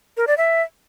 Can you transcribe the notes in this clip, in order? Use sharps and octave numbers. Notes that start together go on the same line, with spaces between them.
A#4
D5
E5